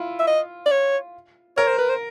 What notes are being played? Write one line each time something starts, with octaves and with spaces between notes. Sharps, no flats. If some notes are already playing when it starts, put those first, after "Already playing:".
Already playing: E4 F4
E5
D#5
D5
C#5
A#4 C#5
C5
B4
C5